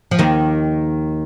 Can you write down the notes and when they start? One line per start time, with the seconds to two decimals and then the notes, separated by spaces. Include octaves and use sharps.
0.11 F3
0.19 D#2 D#3